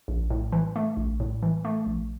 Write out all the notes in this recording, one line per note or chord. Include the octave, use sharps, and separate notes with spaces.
A#1
A2
E3
A3
A#1
A2
E3
A3
A#1